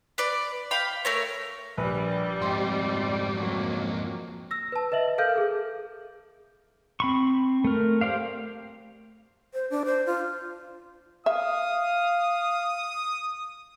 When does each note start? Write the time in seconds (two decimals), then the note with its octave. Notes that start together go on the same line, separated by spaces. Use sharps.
0.18 B4 D5
0.71 F5 G5 B5
1.05 A3 A#4 C#5
1.78 A#1 G3 B4
2.42 F2 G#2 G5 C6
3.37 F#3 A#3
4.51 E6 A#6
4.72 B4 A5
4.92 B4 D#5 E5 F#7
5.18 A4 A#4 F5 F6 G6
5.36 G#4 A4
7.00 C4 B5 C#6
7.64 A3 A#4
8.01 G4 C5 D5 F5
9.54 C5
9.70 D4
9.85 C5
10.06 F4
11.26 E5 F5 D#6